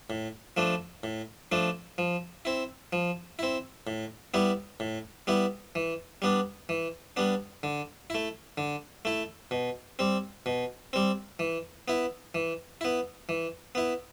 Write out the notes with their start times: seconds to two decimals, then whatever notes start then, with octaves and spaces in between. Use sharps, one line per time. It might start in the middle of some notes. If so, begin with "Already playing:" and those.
0.10 A2
0.57 F3 A3 D4
1.03 A2
1.52 F3 A3 D4
1.98 F3
2.45 C4 E4
2.93 F3
3.39 C4 E4
3.87 A2
4.34 G3 B3 E4
4.80 A2
5.27 G3 B3 E4
5.75 E3
6.22 G3 B3 D4
6.69 E3
7.16 G3 B3 D4
7.63 D3
8.10 A3 E4
8.58 D3
9.05 A3 E4
9.51 B2
9.99 G3 C4
10.46 B2
10.93 G3 C4
11.39 E3
11.88 B3 E4
12.35 E3
12.81 B3 E4
13.29 E3
13.75 B3 E4